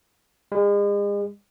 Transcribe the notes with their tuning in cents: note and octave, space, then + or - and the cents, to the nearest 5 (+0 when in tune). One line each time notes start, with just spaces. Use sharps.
G#3 -40